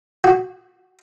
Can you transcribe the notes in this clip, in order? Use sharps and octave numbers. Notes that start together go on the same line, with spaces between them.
F#4